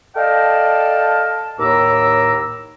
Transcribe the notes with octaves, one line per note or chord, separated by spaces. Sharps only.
A4 D5 D#5 F5 G5 A5
D#2 A2 A#5 D6 E6